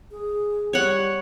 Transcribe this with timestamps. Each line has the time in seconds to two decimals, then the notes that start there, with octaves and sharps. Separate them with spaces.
0.11 G#4
0.73 G3 C#5 F#5